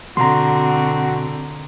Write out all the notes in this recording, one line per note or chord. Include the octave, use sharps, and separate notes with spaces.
B2 D3 C4 F#4 A#5 C6